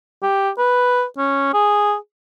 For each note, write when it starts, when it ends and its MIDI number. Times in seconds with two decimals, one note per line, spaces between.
0.23 0.50 67
0.58 1.04 71
1.18 1.50 61
1.53 1.95 68